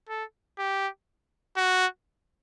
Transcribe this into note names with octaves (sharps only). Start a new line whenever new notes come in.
A4
G4
F#4